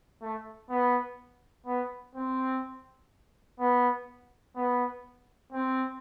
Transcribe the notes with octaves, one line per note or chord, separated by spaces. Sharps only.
A3
B3
B3
C4
B3
B3
C4